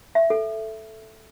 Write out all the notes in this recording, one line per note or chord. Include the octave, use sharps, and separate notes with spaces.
E5
A4